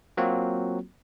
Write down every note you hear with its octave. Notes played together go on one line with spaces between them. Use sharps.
F#3 A#3 C4 F4 F#4